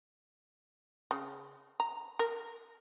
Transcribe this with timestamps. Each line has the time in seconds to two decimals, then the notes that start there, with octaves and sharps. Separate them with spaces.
1.11 C#3
1.80 A#5
2.19 A#4